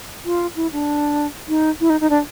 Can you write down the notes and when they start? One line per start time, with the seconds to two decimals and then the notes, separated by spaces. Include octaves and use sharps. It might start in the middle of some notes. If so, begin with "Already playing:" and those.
0.25 F4
0.56 E4
0.72 D4
1.49 D#4
1.81 E4
1.90 D#4
2.01 D#4
2.10 D4